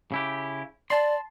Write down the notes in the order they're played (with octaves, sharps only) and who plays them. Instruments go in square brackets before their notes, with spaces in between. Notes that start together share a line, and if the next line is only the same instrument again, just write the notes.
[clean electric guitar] C#3 E4 G4
[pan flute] D5 [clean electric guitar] A5 C6